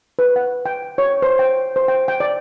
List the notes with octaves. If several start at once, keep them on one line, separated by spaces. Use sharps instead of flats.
B4
F#5
G5
C#5
C5
G5
C5
G5
G5
D5